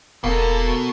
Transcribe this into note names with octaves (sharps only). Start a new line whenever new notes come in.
E1 B2 A#3 A4 A#4